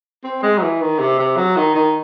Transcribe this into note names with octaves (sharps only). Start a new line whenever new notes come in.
C4
G#3
F#3
E3
D#3
C3
C3
F#3
D#3
D#3